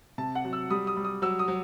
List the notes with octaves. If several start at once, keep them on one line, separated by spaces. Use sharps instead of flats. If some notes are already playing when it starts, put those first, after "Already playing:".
C3 A5
F#5
F#3
E6
G3 D#6
D#6
G3
D#6
F#3 E6
D#6
F#3